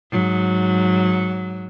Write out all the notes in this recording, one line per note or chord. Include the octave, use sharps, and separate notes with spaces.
G#2 F#3